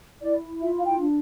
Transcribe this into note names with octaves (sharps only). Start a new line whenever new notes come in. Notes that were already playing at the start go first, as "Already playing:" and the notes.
E4 D5
F4 E5
F5
G5
D4